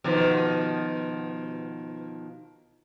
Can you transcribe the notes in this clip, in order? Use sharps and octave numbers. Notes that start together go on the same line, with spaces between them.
B2 D#3 F3